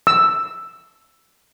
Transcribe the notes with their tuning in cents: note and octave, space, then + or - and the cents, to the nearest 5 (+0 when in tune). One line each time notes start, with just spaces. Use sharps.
E6 +5